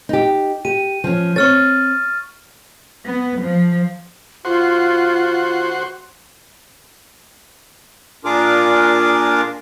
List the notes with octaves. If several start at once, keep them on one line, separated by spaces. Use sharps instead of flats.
D#4 G4
G4 D#7
F3 C#4
C4 C#5 C#6 F6 A6
B3
F3
F4 F#4 C5
A#2 D4 F4 G#4 A#4 D6